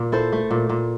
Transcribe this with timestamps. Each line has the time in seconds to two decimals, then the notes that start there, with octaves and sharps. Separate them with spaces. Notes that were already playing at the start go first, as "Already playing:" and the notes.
Already playing: A#2
0.12 E4 A4 C5
0.32 A3
0.51 A#2
0.69 A#2